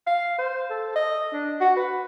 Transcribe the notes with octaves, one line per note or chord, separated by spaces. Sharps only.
F5
C5
A4
D#5
D4
F#4
B4